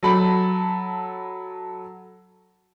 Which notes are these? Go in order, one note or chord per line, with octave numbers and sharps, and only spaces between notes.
F#3 A4 A5 B5